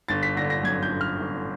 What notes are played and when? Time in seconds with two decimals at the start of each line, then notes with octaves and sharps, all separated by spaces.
0.08 G1 A6
0.23 B6
0.36 D3 A#6
0.50 A#6
0.64 F#2 G#6
0.83 G6
0.92 G1
1.01 F6
1.20 G1